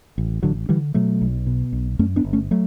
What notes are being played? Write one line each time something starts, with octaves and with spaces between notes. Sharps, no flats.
A1
A1 D3 F#3
D3 E3 G3
B2 F#3 A3
B1
B2
B1
F#2 A3 C#4
B3 D4
G1
A3 C#4
F#3 A3